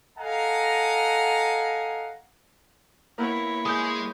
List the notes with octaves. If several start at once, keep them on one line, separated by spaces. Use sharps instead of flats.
A4 D#5 F5 F#5 G#5 A#5
A#3 B3 E4 A#4 C#5
G#3 D#6 G6